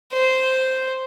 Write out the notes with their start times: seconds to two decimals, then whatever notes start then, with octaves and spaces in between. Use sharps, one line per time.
0.12 C5